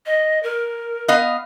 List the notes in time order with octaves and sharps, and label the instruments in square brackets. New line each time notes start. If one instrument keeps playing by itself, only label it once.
[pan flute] D#5
A#4
[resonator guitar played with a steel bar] B3 D#5 F5